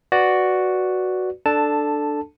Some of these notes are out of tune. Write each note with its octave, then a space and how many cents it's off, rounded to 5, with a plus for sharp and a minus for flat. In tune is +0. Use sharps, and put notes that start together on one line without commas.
F#4 +0 B4 +0 D5 +0
D4 +10 A4 +0 A5 +0